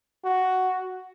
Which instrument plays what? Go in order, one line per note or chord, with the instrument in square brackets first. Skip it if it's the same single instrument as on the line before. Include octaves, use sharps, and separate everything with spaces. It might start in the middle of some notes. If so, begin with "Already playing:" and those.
[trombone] F#4